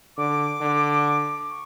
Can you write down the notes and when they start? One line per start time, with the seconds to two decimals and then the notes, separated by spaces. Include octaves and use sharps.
0.17 D3 D6
0.61 D3
1.50 C#6